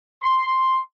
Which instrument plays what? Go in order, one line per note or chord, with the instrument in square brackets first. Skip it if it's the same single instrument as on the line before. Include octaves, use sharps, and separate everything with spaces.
[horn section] C6